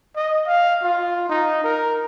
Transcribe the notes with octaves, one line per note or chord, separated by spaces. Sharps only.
D#5
F5
F4
D#4
A#4